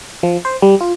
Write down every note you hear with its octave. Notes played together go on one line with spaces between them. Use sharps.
F3
C5
G3
F4